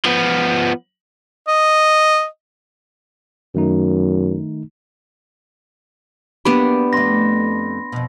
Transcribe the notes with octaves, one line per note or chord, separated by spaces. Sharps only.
F3 B3
D#5
F#2 D#3 A3 D#4
F#3 A#3 B3 D4 G4 B5
F2 A3 C6 A#6
F2 B2